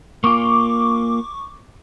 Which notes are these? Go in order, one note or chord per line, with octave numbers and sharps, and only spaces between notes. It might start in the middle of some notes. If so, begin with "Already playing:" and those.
A#3 F4 C#6 D6